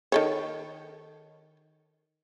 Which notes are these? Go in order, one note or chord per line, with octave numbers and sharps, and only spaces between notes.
D#3 A4 C#5